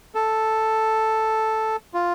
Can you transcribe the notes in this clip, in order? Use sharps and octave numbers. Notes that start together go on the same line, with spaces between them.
A4
F4